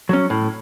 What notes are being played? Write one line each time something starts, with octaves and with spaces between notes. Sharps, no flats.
F#3 C#4
A2